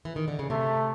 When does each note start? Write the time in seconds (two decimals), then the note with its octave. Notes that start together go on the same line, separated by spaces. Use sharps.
0.05 E3
0.16 D#3
0.28 D3
0.39 C#3
0.50 C3 A3